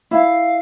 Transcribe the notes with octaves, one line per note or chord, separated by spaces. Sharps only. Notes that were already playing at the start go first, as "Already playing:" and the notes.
E4 F5